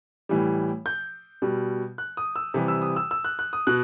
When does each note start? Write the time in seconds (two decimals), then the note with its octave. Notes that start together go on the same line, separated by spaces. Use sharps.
0.29 A2 E3 G3
0.86 G6
1.42 B2 G3
1.98 F#6
2.17 D#6
2.36 E6
2.54 C3 E3 G3
2.68 E6
2.82 D#6
2.96 E6
3.11 E6
3.25 F#6
3.39 F#6
3.53 D#6
3.67 B2 F#6